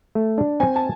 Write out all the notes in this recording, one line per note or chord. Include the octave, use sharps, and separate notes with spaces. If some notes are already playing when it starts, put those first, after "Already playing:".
A3
D4
C4 G#5
A5